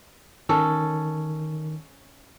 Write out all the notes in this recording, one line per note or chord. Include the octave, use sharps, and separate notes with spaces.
D#3 C#4 A4